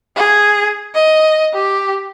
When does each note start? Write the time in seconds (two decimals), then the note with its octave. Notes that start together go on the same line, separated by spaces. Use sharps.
0.16 G#4
0.95 D#5
1.54 G4